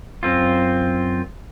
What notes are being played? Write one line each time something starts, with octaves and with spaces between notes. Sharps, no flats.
F#2 C4 F4